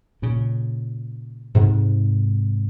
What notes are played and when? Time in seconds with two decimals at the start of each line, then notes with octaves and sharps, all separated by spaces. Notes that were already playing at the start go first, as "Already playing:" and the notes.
0.22 A#2 C#3
1.55 G#2 C3